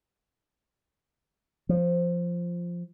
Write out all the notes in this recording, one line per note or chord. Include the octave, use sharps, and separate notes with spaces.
F3